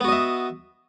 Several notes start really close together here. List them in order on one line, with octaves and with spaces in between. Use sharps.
B3 F#4 D#5 E5